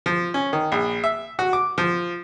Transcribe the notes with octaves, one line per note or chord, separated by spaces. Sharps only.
F3
C#4
D#3
A#1
E5
F#4
D6
F3